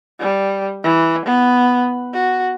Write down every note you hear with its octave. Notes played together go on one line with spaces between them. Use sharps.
G3
E3
B3
F#4